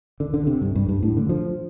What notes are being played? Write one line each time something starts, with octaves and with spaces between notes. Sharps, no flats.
D3
D3
C3
G2
G2
G2
A2
D3
F3